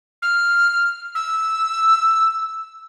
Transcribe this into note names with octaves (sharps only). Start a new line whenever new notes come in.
F6
E6